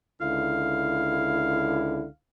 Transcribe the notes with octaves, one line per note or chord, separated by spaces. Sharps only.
C#2 D3 E4 F5